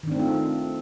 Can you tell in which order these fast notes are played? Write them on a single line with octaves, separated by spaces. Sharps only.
D#3 D4 C4 A3 F4